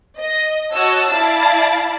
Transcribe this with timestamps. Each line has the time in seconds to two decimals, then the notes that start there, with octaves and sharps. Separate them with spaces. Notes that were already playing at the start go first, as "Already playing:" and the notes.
0.18 D#5
0.73 F#4 C#5 D#5 A5 E6
1.11 E4 D5 F5 A5